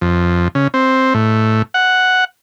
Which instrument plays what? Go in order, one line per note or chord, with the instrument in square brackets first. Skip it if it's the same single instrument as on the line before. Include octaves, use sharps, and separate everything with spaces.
[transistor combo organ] F2
C#3
C4
A2
F#5